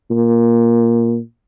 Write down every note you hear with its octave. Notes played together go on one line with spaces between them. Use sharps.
A#2